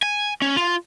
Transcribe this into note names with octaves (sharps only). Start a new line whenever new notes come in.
G#5
C#4
F4